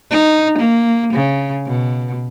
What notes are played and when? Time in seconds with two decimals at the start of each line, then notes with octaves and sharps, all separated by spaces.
0.11 D#4
0.59 A#3
1.14 C#3
1.66 B2